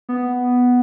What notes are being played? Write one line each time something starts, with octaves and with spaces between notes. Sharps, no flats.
B3